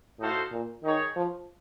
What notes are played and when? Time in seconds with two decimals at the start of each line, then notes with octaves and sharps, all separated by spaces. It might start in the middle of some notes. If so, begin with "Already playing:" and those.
0.19 A2 D#4 F#4 A4 C5 F5
0.52 A#2
0.83 D#3 D#4 G#4 C#5
1.16 F3